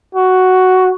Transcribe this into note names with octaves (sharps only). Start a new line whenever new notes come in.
F#4